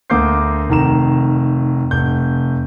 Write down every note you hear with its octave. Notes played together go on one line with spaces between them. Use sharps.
D2 A#3 D6 G6 C7
F1 D#3 A#5 E7
F1 G6